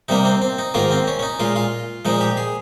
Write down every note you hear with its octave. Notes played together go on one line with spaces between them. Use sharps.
C3 G3 A#3 D#4
C4
C4
D#4
G#2 D#3 A#3 F4
C4
C#4
C#4
D#4
A#2 G#3 F4
F4
A#2 F3 G#3 D#4
G4
G#4